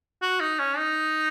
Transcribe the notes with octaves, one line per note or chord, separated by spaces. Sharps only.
F#4
D#4
C#4
D#4